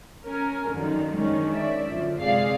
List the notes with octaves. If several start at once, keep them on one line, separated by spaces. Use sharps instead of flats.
C#4 A#4 G#5
F#2 D3 D#3 F3
D#3 G#3 C#4 D4
D5 E5
F#2 D3 F3
C3 G#3 G#4 D5 F5 C7